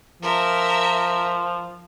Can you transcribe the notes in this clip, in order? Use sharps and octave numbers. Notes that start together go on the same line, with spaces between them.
F3 A#4 E5